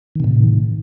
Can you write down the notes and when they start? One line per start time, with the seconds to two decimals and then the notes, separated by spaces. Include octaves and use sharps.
0.15 D#3
0.20 C3
0.24 A2